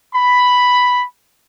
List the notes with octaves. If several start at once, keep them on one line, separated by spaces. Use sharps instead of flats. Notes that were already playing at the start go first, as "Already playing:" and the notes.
B5